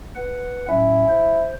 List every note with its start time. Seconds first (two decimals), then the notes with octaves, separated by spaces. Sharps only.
0.16 B4 F#5
0.69 A2 F#3 C#4 E4
1.09 C5